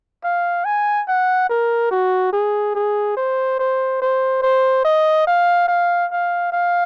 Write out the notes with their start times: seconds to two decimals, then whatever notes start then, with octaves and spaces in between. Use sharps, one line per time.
0.24 F5
0.65 G#5
1.08 F#5
1.49 A#4
1.91 F#4
2.33 G#4
2.75 G#4
3.17 C5
3.59 C5
4.01 C5
4.42 C5
4.85 D#5
5.27 F5
5.68 F5
6.11 F5
6.52 F5